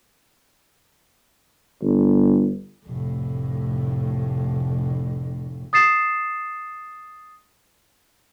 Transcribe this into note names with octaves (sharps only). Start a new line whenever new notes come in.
G1
F1 A2
D#6 A6 C7 E7